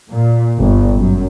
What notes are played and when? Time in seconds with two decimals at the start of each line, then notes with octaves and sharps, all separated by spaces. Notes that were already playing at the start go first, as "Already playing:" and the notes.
0.11 A#2
0.58 G1
0.97 F#2